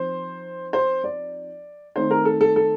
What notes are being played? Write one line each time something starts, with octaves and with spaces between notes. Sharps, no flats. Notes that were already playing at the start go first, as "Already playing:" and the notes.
Already playing: F3 C4 D#4 C5
C5
D5
D#3 A3 C4 D#4 C5
A#4
A4
A4
A4